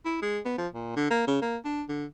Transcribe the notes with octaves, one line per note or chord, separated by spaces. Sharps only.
E4
G#3
B3
F3
A#2
D3
A#3
C#3
A#3
D4
D3